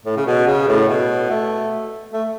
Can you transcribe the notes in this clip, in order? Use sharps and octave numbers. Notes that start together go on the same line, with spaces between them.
A2
C#3
B2
C#3
A2
B2
A3
A3